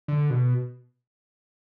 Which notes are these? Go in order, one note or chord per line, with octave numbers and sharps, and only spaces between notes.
D3
B2